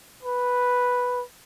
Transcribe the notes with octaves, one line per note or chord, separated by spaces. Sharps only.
B4